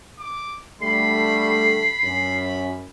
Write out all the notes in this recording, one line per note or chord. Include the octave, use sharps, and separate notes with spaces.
D6
D3 G3 A3 B5 C7
F#2 C#4